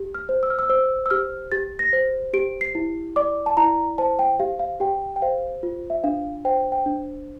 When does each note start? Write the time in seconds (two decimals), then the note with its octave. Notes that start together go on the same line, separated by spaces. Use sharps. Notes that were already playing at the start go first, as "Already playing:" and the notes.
Already playing: G4
0.15 F6
0.29 C5
0.43 E6
0.50 F6
0.59 E6
0.69 C5 E6
1.06 E6
1.10 G4 F6
1.52 G4 A6
1.79 A#6
1.93 C5
2.33 G4 D7
2.61 C7
2.75 E4
3.16 D5 D6
3.46 A5
3.57 E4 A#5
3.98 C5 A5
4.19 G5
4.40 G4 F5
4.59 F5
4.80 G4 G5
5.16 G5
5.22 C5 F5
5.63 F4
5.90 E5
6.04 D4 F5
6.45 C5 G5
6.72 G5
6.86 D4